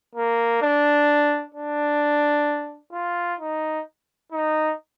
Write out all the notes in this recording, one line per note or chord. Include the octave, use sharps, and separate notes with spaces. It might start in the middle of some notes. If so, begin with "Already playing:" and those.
A#3
D4
D4
F4
D#4
D#4